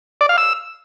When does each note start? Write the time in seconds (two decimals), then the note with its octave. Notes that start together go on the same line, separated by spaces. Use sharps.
0.21 D5
0.29 F5
0.38 E6